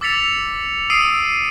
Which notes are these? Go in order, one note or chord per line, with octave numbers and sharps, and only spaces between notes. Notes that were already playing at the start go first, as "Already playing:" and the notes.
D6 E6 A6 B6 C#7 F7
D#6 E6 C7 D7 D#7